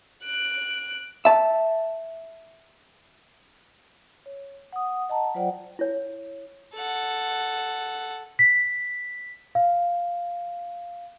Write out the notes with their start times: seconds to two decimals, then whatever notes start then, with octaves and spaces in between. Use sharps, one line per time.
0.24 F#6 D7
1.25 E5 A5
4.26 C#5
4.73 F#5 D#6
5.09 D#5 F#5 A5 A#5
5.35 F#3 F4 C5 D5 F#5 G5
5.79 E4 C#5
6.75 A4 F#5
8.39 B6
9.55 F5